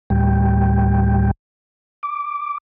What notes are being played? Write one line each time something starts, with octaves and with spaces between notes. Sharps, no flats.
D2 A2 G3 G5
D6